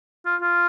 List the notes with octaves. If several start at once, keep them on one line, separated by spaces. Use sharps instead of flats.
F4
F4